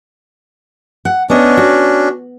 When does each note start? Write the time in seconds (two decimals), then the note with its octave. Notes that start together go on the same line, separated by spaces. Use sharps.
1.05 F#5
1.30 B3 C#4 D4 D#5
1.57 F#4